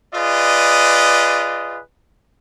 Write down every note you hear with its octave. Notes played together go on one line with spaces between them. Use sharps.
F4 G#4 B4 D5 D#5